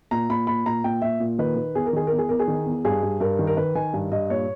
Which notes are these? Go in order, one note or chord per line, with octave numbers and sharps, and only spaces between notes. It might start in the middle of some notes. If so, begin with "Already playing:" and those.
A#2 A#5
A#2 B5
A#2 B5
A#2 A#5
A#2 G5
A#2 E5
A#2
D#3 B4
D#3
E2 G#4
A#4
D#3 G#4
E2 A#4
G#4
E2 A#4
G#4
D#3
E2
G2 G#4
G2
G2 A#4
D#3
A#4
D#3 B4
D#3 G#5
G2
G2 D#5
A#2 C#5